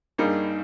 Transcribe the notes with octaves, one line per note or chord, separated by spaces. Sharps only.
G2 G3 A#3 D#4 G#4